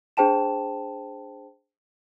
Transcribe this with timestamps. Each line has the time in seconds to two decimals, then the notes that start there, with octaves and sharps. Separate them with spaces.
0.17 D4 G#4 C5 G5 A5 E7